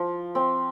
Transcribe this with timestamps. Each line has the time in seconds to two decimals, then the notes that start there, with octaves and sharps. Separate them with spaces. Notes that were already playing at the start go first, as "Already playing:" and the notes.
Already playing: F3
0.35 C4